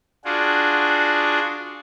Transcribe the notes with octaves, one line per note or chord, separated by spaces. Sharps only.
D4 F4 F#4 G#4